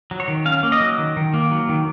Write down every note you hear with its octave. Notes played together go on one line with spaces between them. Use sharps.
F#3
C#5
D#3
C#4 F5
A#3
D#5
F#3
D#3
D#3
A#3
F#3
D#3